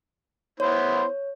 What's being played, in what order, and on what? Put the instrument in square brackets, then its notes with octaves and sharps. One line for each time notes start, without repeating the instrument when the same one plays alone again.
[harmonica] B3 E4 C5 [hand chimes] C#5